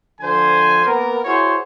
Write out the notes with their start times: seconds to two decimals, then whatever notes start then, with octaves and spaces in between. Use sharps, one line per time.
0.21 D3 F3 A4 C5 G#5
0.86 A#3 B3 A#4
1.25 E4 F#4 G#4 C5 C#5